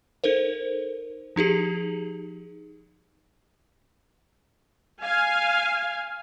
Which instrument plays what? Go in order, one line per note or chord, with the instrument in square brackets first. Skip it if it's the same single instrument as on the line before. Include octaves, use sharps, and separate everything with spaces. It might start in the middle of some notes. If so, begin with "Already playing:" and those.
[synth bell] D#4 A4 A#4 C5
F3 D#4 G4 G#4
[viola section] F5 G#5